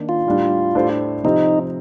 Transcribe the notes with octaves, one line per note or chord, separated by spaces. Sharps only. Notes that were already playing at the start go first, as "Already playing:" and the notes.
Already playing: D#3 A#3 D4
F4
A2 G3 D4
A2 A3 D4 G4 C5
C3 F3 C4 D#4